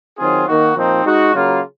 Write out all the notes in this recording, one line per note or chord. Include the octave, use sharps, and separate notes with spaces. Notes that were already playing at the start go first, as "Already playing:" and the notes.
D#3 F#3 C4 F4 G#4
D#3 A#3 D#4 F#4
A#2 F3 C4 D#4
G#3 D#4 F#4
C#3 F#3 A#3 F4